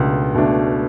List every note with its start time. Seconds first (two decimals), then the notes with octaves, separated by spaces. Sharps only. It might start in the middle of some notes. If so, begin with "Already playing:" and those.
Already playing: C#2 B2 A3 D4
0.35 B2 A3 D4